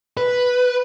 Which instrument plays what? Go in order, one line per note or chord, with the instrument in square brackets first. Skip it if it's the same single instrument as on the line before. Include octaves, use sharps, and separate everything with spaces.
[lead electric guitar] B4